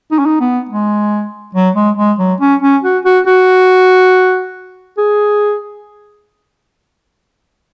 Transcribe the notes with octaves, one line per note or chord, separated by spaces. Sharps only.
D#4
C#4
D#4
B3
G#3
F#3
G#3
G#3
F#3
C#4
C#4
F#4
F#4
F#4
G#4